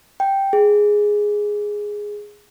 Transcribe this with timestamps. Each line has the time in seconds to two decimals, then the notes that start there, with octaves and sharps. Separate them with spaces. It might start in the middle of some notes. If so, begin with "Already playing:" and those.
0.20 G5
0.53 G#4